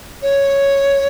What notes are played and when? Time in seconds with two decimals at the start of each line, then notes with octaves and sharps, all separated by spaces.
0.22 C#5